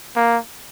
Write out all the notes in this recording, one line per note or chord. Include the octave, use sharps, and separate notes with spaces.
A#3